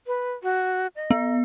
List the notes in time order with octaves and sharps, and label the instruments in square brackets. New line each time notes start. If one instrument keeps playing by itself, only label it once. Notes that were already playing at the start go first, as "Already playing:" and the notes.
[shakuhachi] B4
F#4
D#5
[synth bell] B3